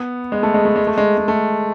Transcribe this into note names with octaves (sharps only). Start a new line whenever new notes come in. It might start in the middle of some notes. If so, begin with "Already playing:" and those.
Already playing: B3
G#3
A3
G#3
A3
G#3
A3
G#3
G#3
A3